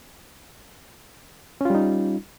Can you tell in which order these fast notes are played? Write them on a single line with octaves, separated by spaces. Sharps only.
C#4 F4 G3 D#4